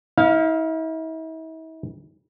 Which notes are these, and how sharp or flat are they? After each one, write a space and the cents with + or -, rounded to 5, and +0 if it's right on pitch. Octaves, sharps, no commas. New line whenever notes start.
E4 -45 F5 +0